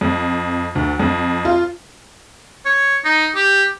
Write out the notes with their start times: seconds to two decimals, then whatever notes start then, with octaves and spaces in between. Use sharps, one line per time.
0.01 F2
0.75 D2
0.99 F2
1.45 F4
2.66 C#5
3.05 D#4
3.35 G4